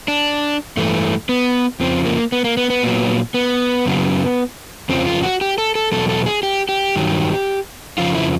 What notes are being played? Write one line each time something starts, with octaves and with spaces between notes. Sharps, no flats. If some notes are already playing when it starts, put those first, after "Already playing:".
D4
G2 E3 A3
B3
F2 C#3 F3 C4
A#3
B3
A#3
B3
B3
A#2 F#3
B3
F#2 C#3 F#3
F2 C#3 F3 C4
F4
F#4
G4
A4
A4
E2 B2 F#3 A4
A4
G#4
G4
G4
G2 D#3 F#3
F2 C#3 F3 F4
E4